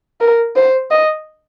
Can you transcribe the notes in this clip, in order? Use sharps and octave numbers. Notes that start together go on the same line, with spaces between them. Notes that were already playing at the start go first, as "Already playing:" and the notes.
A#4
C5
D#5